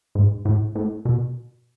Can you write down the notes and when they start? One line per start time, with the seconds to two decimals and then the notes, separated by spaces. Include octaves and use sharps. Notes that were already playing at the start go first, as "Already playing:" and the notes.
0.15 G#2
0.45 A2
0.75 A2
1.05 B2